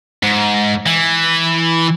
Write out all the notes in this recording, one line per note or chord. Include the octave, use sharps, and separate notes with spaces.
G#2
E3